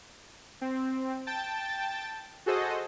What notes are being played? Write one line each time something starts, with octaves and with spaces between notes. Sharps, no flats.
C4
G5 A5 A6
F#4 G#4 A4 C5 D#5